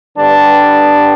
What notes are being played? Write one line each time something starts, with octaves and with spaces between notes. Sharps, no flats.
G2 D3 G3 B3 D4